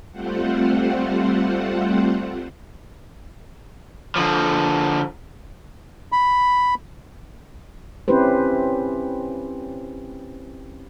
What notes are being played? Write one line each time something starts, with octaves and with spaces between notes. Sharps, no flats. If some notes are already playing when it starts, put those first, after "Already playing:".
G3 A3 C4 F4 C5 F#5
D3 F3
B5
C4 C#4 E4 G4 B4 C5